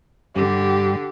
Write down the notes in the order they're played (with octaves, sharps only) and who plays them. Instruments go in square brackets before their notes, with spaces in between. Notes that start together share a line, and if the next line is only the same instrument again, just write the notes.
[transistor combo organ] G2 G3 [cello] D3 [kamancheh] G4